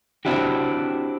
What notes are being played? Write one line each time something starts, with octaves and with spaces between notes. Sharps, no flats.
C4 D4 E4 F#4 G4